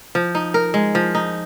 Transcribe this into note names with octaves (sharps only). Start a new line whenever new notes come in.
F3
D#4
A#4
G#3
F3
D#4